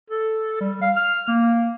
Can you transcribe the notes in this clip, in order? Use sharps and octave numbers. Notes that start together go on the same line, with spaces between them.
A4
G3
F5
F6
A#3